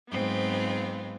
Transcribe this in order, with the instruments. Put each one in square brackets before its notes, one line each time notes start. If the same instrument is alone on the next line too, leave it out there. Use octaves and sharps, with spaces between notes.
[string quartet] G#2 F#3 B3 C4 F4